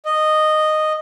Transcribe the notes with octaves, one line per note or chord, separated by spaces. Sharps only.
D#5